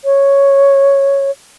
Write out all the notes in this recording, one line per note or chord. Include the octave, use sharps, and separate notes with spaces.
C#5